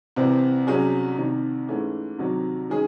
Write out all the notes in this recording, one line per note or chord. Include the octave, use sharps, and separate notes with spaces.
C2 C3 E3 C4
C2 C3 F#3 C#4 G#4
C2 C3 D#3
G#2 E3 A3 C#4
C2 C3 D#3 F#3
D#3 G#3 C#4 G#4